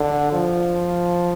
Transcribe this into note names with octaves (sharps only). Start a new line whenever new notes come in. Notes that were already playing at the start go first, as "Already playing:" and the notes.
Already playing: D3
F3